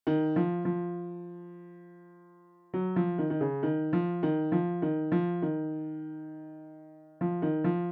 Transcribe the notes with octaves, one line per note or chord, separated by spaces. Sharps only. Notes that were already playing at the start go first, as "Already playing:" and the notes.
D#3
F3
F3
F#3
F3
D#3
D#3
C#3
D#3
F3
D#3
F3
D#3
F3
D#3
F3
D#3
F3